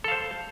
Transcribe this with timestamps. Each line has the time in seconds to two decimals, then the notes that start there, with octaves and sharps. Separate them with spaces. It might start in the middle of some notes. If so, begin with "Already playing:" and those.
0.04 A4
0.08 F5
0.12 C5